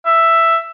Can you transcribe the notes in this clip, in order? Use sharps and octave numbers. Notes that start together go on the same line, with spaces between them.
E5